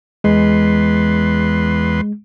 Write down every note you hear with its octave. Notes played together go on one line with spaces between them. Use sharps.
E2 G#3 B4 C6